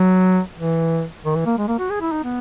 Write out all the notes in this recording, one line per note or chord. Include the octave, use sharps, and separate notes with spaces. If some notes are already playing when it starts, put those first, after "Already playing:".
Already playing: F#3
E3
D#3
E3
A#3
G#3
A#3
F#4
G#4
E4
D#4
B3